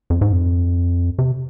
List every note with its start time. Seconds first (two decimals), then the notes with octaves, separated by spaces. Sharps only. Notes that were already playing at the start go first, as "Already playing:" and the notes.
0.10 F2
0.21 G#2
0.33 F2
1.19 C3